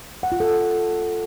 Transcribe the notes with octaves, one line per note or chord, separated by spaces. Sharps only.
F#5
F4
A4